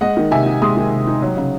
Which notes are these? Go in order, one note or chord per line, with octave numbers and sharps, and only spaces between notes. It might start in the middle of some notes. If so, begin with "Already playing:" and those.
G#3 D#5 F#5
D#3
C3 E5 G#5
D#4
G#3 C6 D#6
D#3
C3
D#4
F#3
C#3